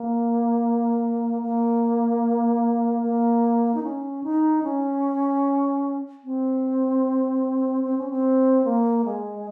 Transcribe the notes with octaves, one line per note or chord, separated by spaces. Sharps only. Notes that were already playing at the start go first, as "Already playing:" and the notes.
Already playing: A#3
A#3
A#3
D#4
C#4
D#4
C#4
C4
C4
C#4
C4
A#3
G#3